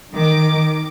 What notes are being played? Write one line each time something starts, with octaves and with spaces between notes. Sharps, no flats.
D#3 D6